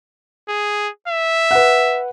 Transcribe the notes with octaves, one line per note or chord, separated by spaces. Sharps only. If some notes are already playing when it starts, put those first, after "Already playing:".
G#4
E5
B4 F#5